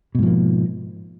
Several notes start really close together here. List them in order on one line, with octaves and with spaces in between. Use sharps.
B2 G#2 F3 A#3